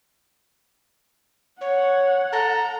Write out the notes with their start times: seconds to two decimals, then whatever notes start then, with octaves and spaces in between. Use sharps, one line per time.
1.61 C#5 F#5
2.33 A4 A#5